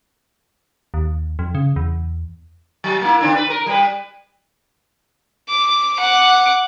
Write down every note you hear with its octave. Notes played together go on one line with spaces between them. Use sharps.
D#2
F2
C#3
E2
F#3
A#3 E4
D3 C4 D4
B4
A#4
G3 B4
D6
F#5 D6